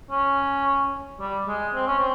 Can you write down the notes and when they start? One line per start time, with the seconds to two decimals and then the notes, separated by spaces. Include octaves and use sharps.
0.11 C#4
1.20 G3
1.47 G#3
1.75 C4
1.87 C#4
1.99 C4